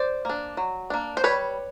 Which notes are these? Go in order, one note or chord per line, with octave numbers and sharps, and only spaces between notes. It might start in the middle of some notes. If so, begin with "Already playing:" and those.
Already playing: C5 D5
A#3 D4
F#3
A#3 D4
C5
G3 B4 C#5